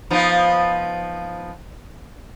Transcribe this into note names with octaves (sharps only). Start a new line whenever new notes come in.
F3 B3 D#4